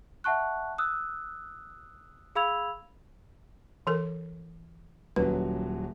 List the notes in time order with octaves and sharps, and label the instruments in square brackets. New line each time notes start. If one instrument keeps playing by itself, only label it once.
[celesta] E5 F#5 A5 C#6 F#6
D#6 E6 F#6
G#4 F5 B5 E6 G#6 F7
[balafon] E3 A4 A#4
[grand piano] D#1 F#3 C#4 [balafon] B4